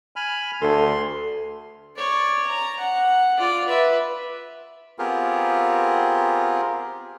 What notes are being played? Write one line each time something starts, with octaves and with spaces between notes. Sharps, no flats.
G#5 B5 F6
D2 A4 C6
C#5 D5
A#5
F#5
F4 D5
B4 E5
B3 C4 F4 G4 G#4 A#4